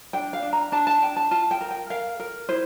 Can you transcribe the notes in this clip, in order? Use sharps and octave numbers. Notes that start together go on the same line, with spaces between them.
D4 G5
F5
D4
A#5
D4 A5
A5
D4 G5
A5
F4 A5
G5
A#4
G5
A#4 F5
A#4
E4 C5